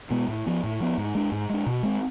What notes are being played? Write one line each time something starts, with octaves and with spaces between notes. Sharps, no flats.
B2 G#3 B3
A2
F3 B3
A2
F3 B3
G#2
G#3 D4
G#2
G#3 D4
B2
G#3 C4